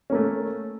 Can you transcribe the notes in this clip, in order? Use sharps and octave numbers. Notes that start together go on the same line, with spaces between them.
A3 A#3 C#4